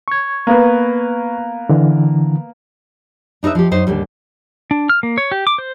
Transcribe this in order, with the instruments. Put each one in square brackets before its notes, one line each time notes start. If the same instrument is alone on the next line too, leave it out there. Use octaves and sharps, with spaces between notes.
[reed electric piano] C#6 G#6
[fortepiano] A#3 B3 B4
[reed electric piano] D3 E3
[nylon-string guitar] D4 D#4 A#4 B4 E5
F3 G4
F#2 D#4 C5
D#2 G#2 D3 G3
[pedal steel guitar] D4
F6
A#3
C#5
G4
D6
C5